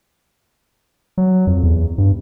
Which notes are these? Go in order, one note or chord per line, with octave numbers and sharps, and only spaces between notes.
F#3
F2
E2
G2